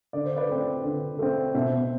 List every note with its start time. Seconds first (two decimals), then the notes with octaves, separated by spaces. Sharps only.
0.13 D3 D5
0.25 C5
0.36 B4 D5
0.49 A3 C4
0.84 D3
1.19 A3 C4
1.55 B2 C5 E5